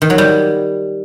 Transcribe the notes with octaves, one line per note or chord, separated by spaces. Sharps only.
D#3
F#3
G3